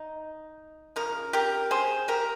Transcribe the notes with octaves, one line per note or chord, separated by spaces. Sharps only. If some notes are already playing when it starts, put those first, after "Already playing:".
Already playing: D#4
C#3 F3 A#4
G4 A#4
G#4 C5
G4 A#4